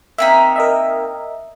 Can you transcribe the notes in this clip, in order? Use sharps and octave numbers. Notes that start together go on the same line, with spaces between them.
A#3 C4 D#4 E5 B6
A#4 D#5 E5